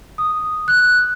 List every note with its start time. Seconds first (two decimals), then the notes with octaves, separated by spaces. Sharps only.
0.18 D#6
0.68 F#6